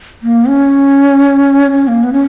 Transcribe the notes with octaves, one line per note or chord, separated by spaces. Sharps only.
A#3
C#4
C#4
A#3
B3
C#4